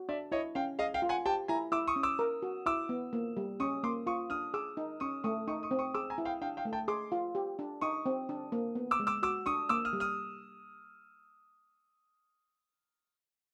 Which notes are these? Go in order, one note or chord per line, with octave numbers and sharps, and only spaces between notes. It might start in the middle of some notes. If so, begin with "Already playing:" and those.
Already playing: F#4
D4 D5 E5
E4 C#5 D#5
C#4 F5 G5
G#4 D#5 F5
F5 G5
F4
F#5 G#5
G4 G5 A5
E4 G#5 A#5
E4 D6 E6
C#6 D#6
C#4
D6 E6
A#4
F#4
E4 D6 E6
B3
A#3
G3
C#4 C#6 D#6
A#3 C6 D6
F4 C#6 D#6
D4 D#6 F6
G#4 D6 E6
D#4
C#4 C#6 D#6
A3 C#6 D#6
D#4 C#6 D#6
C#6 D#6
C4
C#6 D#6
G#4 D6 E6
G#5 A#5
E4
F5 G5
D4 F5 G5
F5 G5
A3
G5 A5
G#4 C6 D6
F4
G4
D4
D#4 C#6 D#6
C4
D4
A#3
B3
D6 E6
G#3
D6 E6
F#4 D6 E6
D4 C#6 D#6
A#3 D6 E6
D#6 F6
G3
D#6 F6